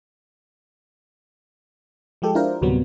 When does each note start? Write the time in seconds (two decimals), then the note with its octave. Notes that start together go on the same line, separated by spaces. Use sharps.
2.22 F3 G#3 G4 A4
2.35 D4 E4 F4 A#4 C5
2.62 D2 A2 C3 F#3 G3 B3